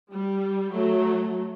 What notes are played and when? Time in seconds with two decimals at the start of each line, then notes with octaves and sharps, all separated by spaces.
0.11 G3
0.72 F#3 A3